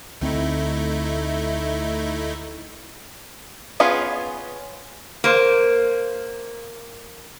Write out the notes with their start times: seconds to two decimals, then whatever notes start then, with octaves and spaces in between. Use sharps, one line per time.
0.21 D2 A3 C4 D#4 E4
3.80 B3 C#4 F4 G#4 B4
5.24 A#3 C5